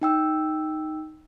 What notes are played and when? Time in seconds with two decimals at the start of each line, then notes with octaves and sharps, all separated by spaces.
0.01 D#4 G5 E6